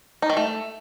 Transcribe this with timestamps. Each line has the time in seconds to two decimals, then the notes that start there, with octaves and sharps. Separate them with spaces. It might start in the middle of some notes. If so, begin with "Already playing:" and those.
0.22 D#4
0.30 D#3
0.37 A3